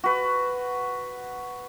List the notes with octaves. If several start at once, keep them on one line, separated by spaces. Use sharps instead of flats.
F#4 B4